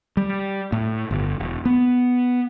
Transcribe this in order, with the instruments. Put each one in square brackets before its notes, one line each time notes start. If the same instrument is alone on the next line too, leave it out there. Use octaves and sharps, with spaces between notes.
[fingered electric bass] G3
A2
G1
E1
B3